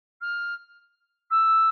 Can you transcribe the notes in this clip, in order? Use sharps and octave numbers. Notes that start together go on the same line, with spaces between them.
F6
E6